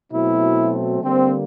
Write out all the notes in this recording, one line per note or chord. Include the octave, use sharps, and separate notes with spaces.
B2 F#3 A3 C4 E4
D3 G3 A#3 C4